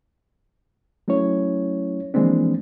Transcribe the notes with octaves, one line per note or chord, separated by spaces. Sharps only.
F#3 A3 C#4 E4 C#5
E3 F3 G#3 A#3 C4 D4